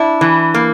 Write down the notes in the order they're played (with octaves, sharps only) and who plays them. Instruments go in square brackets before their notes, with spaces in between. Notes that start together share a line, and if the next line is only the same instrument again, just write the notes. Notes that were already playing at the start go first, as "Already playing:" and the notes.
Already playing: [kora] D4 [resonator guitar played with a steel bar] E4
[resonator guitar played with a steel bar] E3
A#3